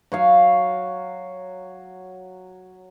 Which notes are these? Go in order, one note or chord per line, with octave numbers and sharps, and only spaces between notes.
F#3 C#5 F5